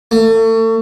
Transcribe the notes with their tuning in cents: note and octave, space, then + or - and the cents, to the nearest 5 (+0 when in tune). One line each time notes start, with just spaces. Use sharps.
A3 +35